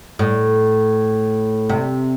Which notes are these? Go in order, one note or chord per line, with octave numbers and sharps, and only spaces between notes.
A2
C3